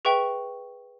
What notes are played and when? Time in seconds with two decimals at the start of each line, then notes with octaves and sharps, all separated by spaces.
0.05 G#4 B4 E5 G5 C#6